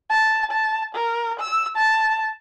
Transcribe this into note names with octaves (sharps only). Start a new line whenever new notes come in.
A5
A5
A#4
E6
A5